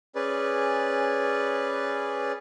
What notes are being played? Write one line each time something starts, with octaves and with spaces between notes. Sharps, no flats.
C#4 G#4 B4 D5